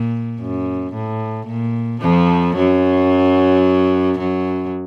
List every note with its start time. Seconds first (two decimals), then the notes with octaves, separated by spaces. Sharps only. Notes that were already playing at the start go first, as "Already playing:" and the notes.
Already playing: A#2
0.40 F#2
0.93 A2
1.47 A#2
2.01 F2 F3
2.56 F#2 F#3
4.18 F#2 F#3